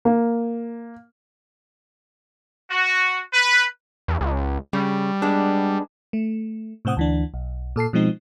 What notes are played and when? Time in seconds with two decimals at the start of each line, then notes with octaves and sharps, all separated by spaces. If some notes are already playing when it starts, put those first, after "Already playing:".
0.05 A#3
2.71 F#4
3.33 B4
4.08 E2
4.21 C#2
4.73 C#3 G3
5.22 G#3 B3 D4
6.13 A3
6.85 A2 C3 C4 F#5 D#6
6.97 D2 E3 D4
7.34 B1
7.76 A#2 A4 A5 C7
7.93 B2 F3 G#3 C4 D#4